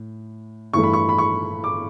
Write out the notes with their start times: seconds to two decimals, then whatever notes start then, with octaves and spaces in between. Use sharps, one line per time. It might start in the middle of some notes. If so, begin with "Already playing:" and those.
Already playing: A2
0.73 G2 E3 A3 C#6
0.84 B5
0.93 C#6
1.09 B5
1.18 C#6
1.64 D6